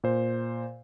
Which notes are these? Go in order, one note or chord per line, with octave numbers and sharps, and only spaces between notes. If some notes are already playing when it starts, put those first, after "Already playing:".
A#2 C5